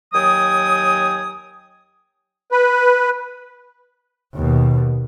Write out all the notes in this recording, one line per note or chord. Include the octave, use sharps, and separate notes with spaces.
D#2 F#3 G5 G#5 D#6
B4
D#2 B2